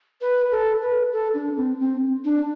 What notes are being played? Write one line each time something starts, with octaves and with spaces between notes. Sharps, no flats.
B4
A4
B4
A4
D4
C4
C4
D4